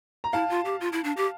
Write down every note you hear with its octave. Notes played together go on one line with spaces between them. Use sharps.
A#5
E4 F5 A5
F4
G4
F4
E4
D4
G4